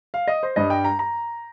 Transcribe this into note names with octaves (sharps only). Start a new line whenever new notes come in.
F5
D#5
C5
G2 G3 D#5
G5
A#5
A#5